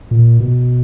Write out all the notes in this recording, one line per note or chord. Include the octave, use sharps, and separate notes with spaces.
A#2
B2